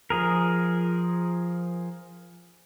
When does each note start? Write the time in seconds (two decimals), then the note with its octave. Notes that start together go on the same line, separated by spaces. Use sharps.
0.10 F3 G#4 A#4